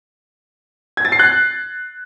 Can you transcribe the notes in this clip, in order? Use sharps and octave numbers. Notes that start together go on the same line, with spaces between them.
G#6
A6
C7
F#6